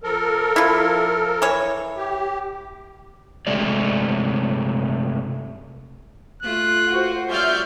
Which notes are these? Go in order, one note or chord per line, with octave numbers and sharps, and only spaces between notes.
F3 A4 A#4
E4 F4
E3 C#5
G4
G2 C3 G#3 A3 D5
A3 F4 F#6
F#4 C5
G3 F4 C#5 D5 E5 F6 G6